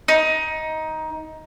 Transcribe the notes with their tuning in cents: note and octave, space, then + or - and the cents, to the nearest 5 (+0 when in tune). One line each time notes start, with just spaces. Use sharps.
D#4 +15